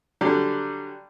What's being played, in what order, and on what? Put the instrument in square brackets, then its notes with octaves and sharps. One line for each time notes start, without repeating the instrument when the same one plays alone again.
[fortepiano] D3 F#3 G3